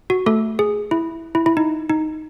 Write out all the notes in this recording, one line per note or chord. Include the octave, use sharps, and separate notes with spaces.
F#4
A3 A4
G#4
E4
E4
E4
D#4
D#4